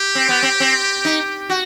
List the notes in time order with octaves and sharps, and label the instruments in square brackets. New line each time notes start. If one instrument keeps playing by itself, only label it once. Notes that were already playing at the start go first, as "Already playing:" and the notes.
Already playing: [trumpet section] G4
[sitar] C4
B3
C4
C4
D#4
F#4